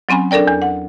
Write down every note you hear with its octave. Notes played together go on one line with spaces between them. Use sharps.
F#3 C4 C#4 G#5 B5
D4 A4 A#4 D5 G5
E2
F#5